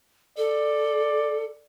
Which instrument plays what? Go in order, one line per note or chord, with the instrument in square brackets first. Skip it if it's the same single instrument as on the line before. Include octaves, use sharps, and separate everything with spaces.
[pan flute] A4 [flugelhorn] D5